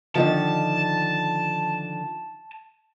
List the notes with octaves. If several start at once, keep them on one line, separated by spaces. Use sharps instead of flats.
D3 D#3 F3 A5